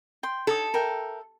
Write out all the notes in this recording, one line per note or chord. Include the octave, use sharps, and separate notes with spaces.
G5 C6
D#4 A4 C#5 D#6
A#4 E5 G5